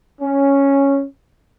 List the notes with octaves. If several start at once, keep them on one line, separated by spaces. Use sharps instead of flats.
C#4